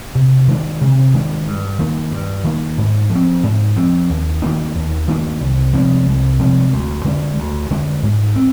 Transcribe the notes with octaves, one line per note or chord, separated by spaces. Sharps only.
C3
D#3 G#3 D4
C3
D#3 G#3 D4
G2
D#3 A#3
G2
D#3 A#3
G#2
F3
C4
G#2
F3 C4
D#2
D#3 A#3 D4
D#2
D#3 A#3 D4
C2
C3 F3 G#3
C2
C3 F3 G#3
D2
D3 G#3 D4
D2
D3 G#3 D4
G#2
C4